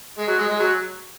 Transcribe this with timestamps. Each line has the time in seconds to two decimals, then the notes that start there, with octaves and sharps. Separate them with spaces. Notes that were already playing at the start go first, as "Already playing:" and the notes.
0.18 G#3
0.28 F#3
0.39 G#3
0.49 G#3
0.60 F#3